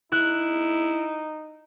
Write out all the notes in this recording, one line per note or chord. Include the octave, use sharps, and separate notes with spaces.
D#4 E4 F#6